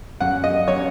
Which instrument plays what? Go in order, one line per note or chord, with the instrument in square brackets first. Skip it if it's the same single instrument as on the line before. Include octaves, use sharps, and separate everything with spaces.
[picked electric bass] F#2 F#3 C#4 [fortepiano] F#5
[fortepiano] D#5
[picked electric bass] F#3 C#4 [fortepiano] C#5